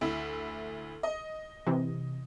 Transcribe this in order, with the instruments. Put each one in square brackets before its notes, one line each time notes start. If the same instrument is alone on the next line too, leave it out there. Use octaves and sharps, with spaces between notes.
[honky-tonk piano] D2 E4
D#5
[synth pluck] C3 E3